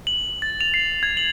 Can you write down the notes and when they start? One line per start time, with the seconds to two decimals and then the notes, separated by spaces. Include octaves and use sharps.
0.07 F#7
0.42 A6
0.61 F7
0.74 C7
1.03 G#6
1.17 F#7